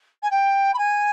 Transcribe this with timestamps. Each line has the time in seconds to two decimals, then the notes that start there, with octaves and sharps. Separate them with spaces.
0.22 G#5
0.30 G5
0.73 B5
0.78 G#5